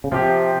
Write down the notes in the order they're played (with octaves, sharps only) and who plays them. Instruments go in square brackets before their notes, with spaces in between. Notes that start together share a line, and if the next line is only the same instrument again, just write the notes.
[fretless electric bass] C#3
[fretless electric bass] C3 [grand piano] F3 C4 G4